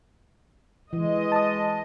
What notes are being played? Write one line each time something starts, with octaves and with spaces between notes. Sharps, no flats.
E3 G#3 D#5
A5 D#6